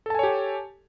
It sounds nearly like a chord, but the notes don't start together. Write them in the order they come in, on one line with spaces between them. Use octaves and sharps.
A4 A5 G#5 C#5 G4